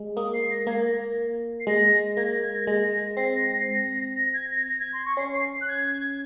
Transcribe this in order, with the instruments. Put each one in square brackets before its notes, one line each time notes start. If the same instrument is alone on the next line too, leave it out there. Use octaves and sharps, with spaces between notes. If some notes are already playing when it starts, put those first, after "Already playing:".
Already playing: [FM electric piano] G#3
[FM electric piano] A#3 [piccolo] D#6
[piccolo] C7
A#6
[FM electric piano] A#3 [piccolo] G#6
[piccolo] A#6
C7
[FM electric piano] G#3 [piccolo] A#6
[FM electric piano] A#3 [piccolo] G#6
[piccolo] A#6
G#6
A#6
[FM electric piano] G#3 [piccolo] A#6
[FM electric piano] C4 [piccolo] C7
[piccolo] A#6
A#6
C7
A#6
A#6
G#6
A#6
A#6
G#6
C6
C#6
[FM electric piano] C#4 [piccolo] C7
[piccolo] C7
F#6
G#6